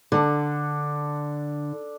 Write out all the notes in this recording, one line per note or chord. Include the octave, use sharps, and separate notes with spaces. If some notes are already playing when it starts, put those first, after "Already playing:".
D3 D4 A4